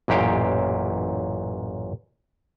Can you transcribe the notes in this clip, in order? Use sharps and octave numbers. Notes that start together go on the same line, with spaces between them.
A1 F#2 A#2 G4 F5 G5